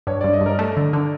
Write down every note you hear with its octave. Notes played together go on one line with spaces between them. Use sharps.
G2 C#5
G2 D5
D#5
G2 A#4
A3 A4
D3
D3